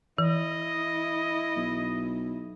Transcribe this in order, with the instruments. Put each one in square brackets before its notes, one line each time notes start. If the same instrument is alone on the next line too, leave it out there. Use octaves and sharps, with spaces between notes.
[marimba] E3 [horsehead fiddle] E4 [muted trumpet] D#5
[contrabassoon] B1